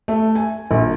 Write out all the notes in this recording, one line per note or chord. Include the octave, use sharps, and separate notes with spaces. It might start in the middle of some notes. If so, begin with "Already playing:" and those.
A3
G#5
A#1